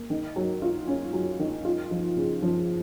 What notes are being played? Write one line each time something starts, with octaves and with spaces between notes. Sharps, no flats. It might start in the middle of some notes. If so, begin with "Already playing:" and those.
Already playing: A#3
D#3
F#3
F4
C#4
F#3
D#3
F4
F3
C#3
F3